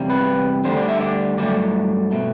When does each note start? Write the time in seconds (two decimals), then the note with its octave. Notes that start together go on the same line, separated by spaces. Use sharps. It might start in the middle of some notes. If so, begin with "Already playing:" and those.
Already playing: E2 C3 G3
0.10 B4
0.64 D2 D3 G3 C5
0.77 D5
0.89 E5
1.01 D5
1.37 G2 F#3 A3 D5
2.11 B2 A3